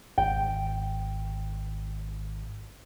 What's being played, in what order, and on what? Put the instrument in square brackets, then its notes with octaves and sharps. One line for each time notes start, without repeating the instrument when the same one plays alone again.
[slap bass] G#1 [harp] G5